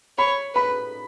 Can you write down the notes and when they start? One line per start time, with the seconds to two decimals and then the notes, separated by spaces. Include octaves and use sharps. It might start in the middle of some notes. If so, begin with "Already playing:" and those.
0.18 C#5 B5
0.55 B4 B5